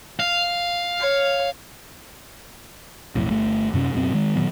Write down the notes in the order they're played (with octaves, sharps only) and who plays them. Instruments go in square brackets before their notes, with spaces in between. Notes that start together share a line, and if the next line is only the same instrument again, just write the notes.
[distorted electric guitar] F5
[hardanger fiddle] C#5
[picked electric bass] B1 F2 A2
G1 A3
F#2 C3 C4 C#4
D1 F#2 B2 C4
D#3 G#3
A#2 D#3 F#3 B3